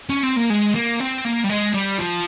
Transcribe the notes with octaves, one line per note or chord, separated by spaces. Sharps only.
C#4
C4
A#3
G#3
A#3
C4
A#3
G3
G#3
G3
F3